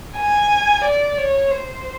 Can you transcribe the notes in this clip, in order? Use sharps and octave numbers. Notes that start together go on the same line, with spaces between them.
G#5
D5
C#5
C5